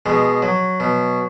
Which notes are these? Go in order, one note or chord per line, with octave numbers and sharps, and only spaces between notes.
B2 G#3
F#3
B2